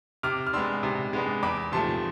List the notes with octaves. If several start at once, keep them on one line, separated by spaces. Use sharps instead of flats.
C3 D6 F6
F6
G#3 B3 D4 C6 E6
C3
G#3 B3 D4
E2 B5 D6
C3 F3 A3 A5 C6